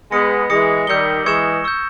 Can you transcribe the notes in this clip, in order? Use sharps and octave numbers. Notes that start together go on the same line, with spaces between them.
G#3 B3 D#6 A#6 C#7
E3 G#3 D#6 A#6 C#7
D#3 G3 E6 G6 C#7 G7
E3 G#3 C#6 E6 G#6 C#7 E7
C#6 E6 G6